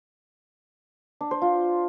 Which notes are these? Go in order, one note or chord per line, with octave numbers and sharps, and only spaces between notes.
D4
C5
F4